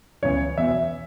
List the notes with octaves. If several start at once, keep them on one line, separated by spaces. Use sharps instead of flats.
C#2 C#3 E3 B3 C#5
E2 B2 B3 E5